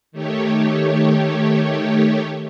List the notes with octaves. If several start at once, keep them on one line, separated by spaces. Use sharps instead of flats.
D#3 A3 G4 C#5